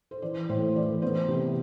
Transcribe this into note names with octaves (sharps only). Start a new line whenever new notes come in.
C5
E3 D5
A2 C5
E3 D5
B3 C5
C3